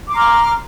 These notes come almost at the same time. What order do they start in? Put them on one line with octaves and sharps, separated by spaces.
D6 C6 A#5 F6